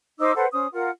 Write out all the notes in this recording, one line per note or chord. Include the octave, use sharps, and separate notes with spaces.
D#4 C5 D6 E6
A4 B4 C5 F#5
C#4 C5 D#6
F4 A#4 F#5